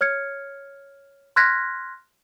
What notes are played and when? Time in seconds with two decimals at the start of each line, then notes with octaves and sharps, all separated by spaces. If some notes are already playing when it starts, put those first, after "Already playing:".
0.01 C#5 F6 G#6 C#7
1.36 C6 F6 F#6 G#6 A#6 B6